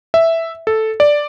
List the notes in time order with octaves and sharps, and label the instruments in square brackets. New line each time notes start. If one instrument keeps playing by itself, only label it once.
[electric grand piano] E5
A4
D5